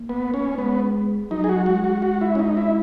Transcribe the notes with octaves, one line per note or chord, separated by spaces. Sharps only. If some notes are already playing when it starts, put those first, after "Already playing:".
Already playing: A#3
B3
C#4
G#3 B3
F#3 D#4
G#4
F#4
G#3 F#4
F#4
F#4
E4
C#4
D#4
E4